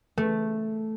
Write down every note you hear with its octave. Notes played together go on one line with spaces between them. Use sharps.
A3